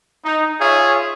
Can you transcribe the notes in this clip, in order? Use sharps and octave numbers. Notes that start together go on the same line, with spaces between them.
D#4
F4 G#4 C#5 E5